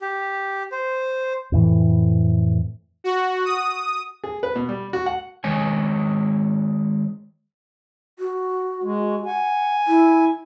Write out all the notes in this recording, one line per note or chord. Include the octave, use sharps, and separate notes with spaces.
G4
C5
F2 A2 E3
F#4
D#6
G#4
B4
B2
G3
F#4
F#5
D#3 G#3 C#5 G#5
F#4
G#3
F#5 G#5
E4